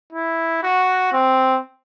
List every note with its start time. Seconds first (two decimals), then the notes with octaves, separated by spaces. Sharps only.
0.13 E4
0.63 F#4
1.13 C4